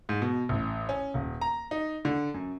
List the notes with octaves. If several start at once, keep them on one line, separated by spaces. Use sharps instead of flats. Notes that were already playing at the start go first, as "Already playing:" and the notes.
G#2
B2
A1
C#4
D#1
A#5
D#4
D3
F#2